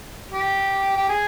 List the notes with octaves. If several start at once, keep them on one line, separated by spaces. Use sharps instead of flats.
G4
G4
G#4